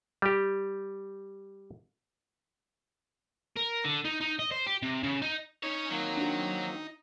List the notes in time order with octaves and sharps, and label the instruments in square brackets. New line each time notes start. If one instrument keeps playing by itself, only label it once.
[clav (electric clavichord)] G3 G4
[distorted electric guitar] A#4
D3
D#4
D#4
D#5
C5
G4
C3
C#3
D#4
[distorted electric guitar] C#4 C#5 [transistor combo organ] D#4
[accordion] D#3 A#3 C4 [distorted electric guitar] F#3
[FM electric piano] D4 F#4